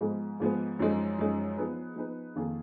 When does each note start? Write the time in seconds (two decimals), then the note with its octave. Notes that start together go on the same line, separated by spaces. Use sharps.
0.01 G#2 F3 G#3 B3
0.40 G#2 F3 G#3 B3
0.79 F#2 F3 G#3 D#4
1.18 F#2 F3 G#3 D#4
1.57 F3 B3 D#4 G#4 B4
1.96 F3 B3 D#4 G#4 B4
2.36 F2 D#3 A#3 F4 G#4